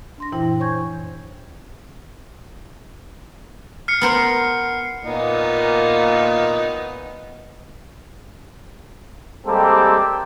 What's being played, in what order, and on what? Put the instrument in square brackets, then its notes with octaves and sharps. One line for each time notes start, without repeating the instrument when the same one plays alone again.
[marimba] D4 C6 A#6
F#2 A#2 E3 E4 C5 G5
C5 C#5 G#5 C#6 G6 G#6
[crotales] F6 C7 C#7
[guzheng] B3 A#4 C5
[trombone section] A#2 A#3 [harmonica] B3 D#4
[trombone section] G3 G#3 A#3 C4 G4 A4